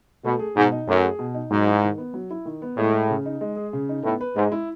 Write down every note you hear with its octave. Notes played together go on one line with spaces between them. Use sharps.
B2 A3
G#4
G#2 B2
D#4
F#2 A3
G#4
B2
D#4
G#2 F#3
E4
D#3
B3
F#3
E4
D#3
B3
A2 G#3
G#4
C#3
D#4
G#3
G#4
C#3
D#4
A2 B3
B4
G#2 G#3
E4